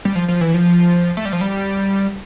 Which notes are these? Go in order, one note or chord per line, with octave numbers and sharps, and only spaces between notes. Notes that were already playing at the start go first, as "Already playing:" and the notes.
G3
F3
F3
E3
F3
A3
G3
F3
G3